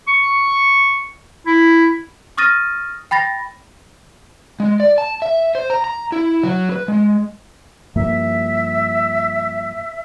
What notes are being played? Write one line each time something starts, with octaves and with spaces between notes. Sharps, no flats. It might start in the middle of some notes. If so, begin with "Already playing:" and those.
C#6
E4
C#6 D#6 F6 A6 A#6 D#7
G5 B5 A6 A#6
G#3
D5
A5
E5
C5
A#5
A#5
E4
F#3
B4
G#3
G2 F3 A#3 E5